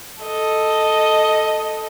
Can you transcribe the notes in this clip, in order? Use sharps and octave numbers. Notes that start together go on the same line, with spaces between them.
A4 D#5